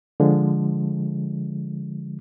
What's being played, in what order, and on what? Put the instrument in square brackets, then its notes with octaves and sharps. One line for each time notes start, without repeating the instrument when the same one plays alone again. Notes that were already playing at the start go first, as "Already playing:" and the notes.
[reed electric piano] D3 F3 G#3